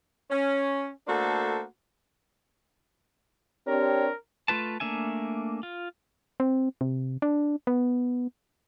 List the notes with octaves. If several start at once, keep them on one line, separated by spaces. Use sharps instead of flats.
C#4
A3 A#3 D4 F#4 A4 C5
C4 D4 G4 A#4 C#5
A3 F4 B4 A5
A3 A#3 D4 E5 G#5
F4
C4
C3
D4
B3